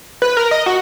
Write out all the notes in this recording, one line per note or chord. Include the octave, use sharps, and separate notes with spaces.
B4
A#4
D#5
F#4